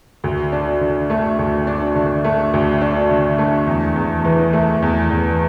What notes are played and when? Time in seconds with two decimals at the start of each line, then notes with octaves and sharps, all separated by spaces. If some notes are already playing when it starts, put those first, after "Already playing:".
0.24 D2
0.52 D4
0.81 D3
1.10 A3
1.39 D2
1.67 D4
1.95 D3
2.24 A3
2.53 D2
2.81 D4
3.10 D3
3.38 A3
3.67 E2
3.96 E2
4.25 E3
4.53 A3
4.82 E2
5.10 E2